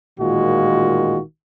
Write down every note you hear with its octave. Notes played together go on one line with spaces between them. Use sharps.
A1 A#2 D#3 G#3 F4 F#4